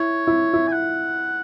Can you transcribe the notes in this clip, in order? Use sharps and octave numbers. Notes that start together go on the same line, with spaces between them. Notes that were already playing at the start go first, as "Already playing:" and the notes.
Already playing: E4 C#5
E4
E4
G#5
F#5